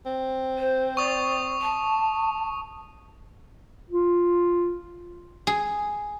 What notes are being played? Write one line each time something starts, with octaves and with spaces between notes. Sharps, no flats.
C4
C5
D5 C#6 D#6
A5
F4
G#4